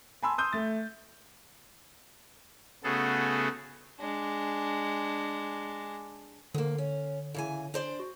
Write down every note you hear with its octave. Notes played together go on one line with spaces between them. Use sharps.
G#5 A5 B5 C6 E6
C6 D#6 E6 G6
A3 A6
C#3 A3 B3 F#4 G#4 A4
G#3 D4
D2 D3 A#3
C#4
C#3 E3 G#5
D4 C5 D5
F#4